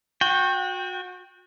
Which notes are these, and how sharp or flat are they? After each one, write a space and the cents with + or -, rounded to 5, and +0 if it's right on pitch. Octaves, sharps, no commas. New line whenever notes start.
F#4 -25 G5 +0